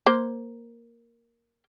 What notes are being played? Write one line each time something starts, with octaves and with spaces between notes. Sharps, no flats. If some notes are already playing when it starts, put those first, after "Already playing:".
A#3 C5